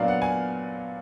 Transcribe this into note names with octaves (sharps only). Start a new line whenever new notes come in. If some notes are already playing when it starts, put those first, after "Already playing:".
Already playing: A#2 F#3 B3 D4 D5 F5
F#5
G#5